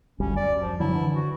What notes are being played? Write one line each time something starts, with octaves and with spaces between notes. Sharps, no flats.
G1 D2 G3 C#4
F#2 D5
F3
D3 F3 F#3 E4
D3 E3
F#4